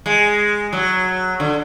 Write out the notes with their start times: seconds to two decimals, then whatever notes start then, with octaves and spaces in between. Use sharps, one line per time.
0.06 G#3
0.72 F#3
1.40 D3